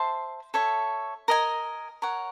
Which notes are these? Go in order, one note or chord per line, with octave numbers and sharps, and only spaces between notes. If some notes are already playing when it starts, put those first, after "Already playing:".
Already playing: C5 E5 A5 C6
A4 C#5 E5
A#4 D#5 G#5
A#4 C#5 F#5